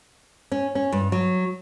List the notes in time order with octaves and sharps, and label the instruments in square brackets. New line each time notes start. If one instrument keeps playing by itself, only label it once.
[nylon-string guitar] C#4
C#4
G2
F#3